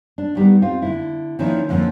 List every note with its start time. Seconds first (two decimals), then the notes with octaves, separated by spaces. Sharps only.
0.18 D4
0.35 D#3 G3 B3
0.62 C4 F4
0.82 D3 E4
1.39 D#3 F3 A#3 C#4 D4 E4
1.69 F2 D3 F3 A#3 C#4